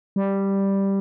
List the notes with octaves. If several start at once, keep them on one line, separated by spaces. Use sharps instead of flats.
G3